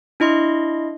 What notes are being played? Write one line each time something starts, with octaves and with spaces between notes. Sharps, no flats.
D4 E4 D#5 C6